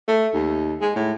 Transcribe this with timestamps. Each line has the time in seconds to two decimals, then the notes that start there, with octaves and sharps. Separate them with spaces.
0.08 A3
0.34 D#2
0.82 G#3
0.96 A2